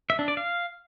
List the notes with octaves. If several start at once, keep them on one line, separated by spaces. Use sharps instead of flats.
E5
D4
D5
F5